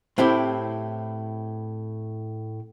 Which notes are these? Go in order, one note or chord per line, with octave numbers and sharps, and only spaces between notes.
A2 C4 E4 G4